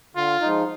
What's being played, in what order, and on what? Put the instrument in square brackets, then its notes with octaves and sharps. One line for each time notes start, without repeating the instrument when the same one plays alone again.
[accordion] D3 [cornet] F4
[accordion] F3 G#3 D#4